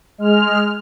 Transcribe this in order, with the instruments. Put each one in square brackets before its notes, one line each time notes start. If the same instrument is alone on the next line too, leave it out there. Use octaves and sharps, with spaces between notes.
[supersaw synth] G#3 F6